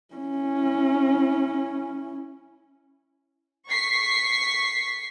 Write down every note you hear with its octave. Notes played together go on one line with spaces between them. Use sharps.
C#4 E4
C#6 B6 C7